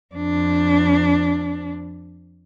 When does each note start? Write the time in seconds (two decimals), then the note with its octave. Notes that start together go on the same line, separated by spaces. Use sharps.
0.15 F2 D4